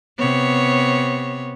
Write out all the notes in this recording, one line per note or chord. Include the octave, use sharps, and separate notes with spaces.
C3 B3 C#5